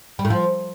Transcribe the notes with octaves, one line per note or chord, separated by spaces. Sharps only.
G3
A2
F3